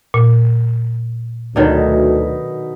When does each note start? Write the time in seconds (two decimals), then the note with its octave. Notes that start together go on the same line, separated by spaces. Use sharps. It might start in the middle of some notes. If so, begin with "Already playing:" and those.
0.14 A#2
1.56 D2 B2 D3 D#3 F#3 D#4